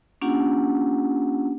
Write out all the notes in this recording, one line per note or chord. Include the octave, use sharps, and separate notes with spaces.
A#3 C#4 D4 F4 G4 F#5